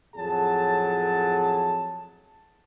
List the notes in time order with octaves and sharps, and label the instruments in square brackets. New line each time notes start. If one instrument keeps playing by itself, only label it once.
[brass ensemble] F2 A2 F#3 G#4 A5